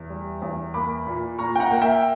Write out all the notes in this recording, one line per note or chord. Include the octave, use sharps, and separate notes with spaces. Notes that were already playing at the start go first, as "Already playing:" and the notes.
Already playing: E2
G3
E2
A#3 B5 D6
A#2
A#2 A#5 C#6
G5
F#5 A#5
A#3
E5 G5